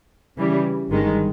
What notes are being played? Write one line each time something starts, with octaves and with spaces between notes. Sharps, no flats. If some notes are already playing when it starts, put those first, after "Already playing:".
C#3 E3 G3
G1 G2 D#3 G#3